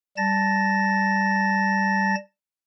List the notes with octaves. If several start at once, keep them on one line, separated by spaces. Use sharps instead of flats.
G3 A5 A6 A#6